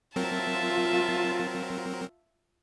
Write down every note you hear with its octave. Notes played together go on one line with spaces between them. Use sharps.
F#3 C4 F4 A#4 E5 A5